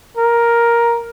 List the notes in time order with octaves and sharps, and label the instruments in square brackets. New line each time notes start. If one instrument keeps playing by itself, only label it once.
[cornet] A#4